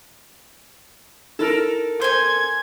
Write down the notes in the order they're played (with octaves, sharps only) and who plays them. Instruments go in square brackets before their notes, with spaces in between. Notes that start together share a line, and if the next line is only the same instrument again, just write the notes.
[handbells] D#4 E4 F6 [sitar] A4 A#4
[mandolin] C5 G#5 [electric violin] G#6